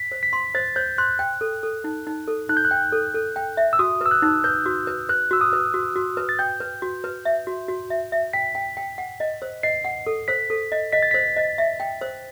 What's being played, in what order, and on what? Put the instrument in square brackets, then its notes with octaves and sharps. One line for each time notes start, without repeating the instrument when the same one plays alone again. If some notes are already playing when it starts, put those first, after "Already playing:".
Already playing: [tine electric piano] B6
[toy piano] C5
[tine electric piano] B6
[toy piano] C6
[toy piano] C5 [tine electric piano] A6
[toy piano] C5 [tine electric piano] G6
[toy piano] C6 [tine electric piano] F#6
[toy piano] G5
A4
A4
D#4
D#4
A4
[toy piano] D#4 [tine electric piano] F#6
[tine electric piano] G6
F#6
[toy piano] G5
A4
A4
G5
E5
[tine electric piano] E6
[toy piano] F#4 [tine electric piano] D#6
[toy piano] B4 [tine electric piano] E6
[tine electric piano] F#6
[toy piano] D#4
[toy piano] B4 [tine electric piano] G6
[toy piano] F#4
B4
[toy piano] B4 [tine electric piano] F#6
[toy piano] F#4 [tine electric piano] E6
[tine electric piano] D#6
[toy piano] B4
F#4
F#4
B4
[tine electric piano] A6
[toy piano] G5 [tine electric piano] G6
[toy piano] B4
F#4
B4
E5
F#4
F#4
E5
E5
[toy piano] G5 [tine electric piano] B6
[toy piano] G5
G5
F#5
D#5
C5
[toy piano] D#5 [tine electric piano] C7
[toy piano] F#5
A4
[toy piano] C5 [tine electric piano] B6
[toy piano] A4
D#5
[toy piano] D#5 [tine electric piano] B6
[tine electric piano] A6
[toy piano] C5 [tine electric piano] B6
[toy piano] D#5
E5
G5
C5